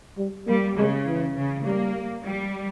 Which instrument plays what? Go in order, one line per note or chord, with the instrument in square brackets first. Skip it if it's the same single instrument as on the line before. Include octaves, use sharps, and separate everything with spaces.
[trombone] G3
[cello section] G3 [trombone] A#3
[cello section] C#3 [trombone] G#3
[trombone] E3
[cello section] C#3
[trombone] G3 [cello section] A#3
[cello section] G3